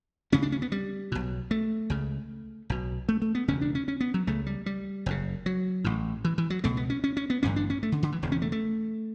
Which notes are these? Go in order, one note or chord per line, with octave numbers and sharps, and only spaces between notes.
D2 C#3 C#4
D4
C#4
B3
G3
B1 B2
A3
C#2 C#3
B1 B2
A3
A3
B3
E1 D2 C#3 C#4
D4
C#4
C#4
B3
F#3
C#2 C#3 A3
G3
G3
F#1 F#2 C#3
F#3
A1 A2
E3
E3
F#3
C#2 B2 A3
B3
C#4
C#4
C#4
B3
A1 G2 D3 C#4
D4
C#4
A3
D3
D3
E3
E1 E2 C#3
C#4
A3
A3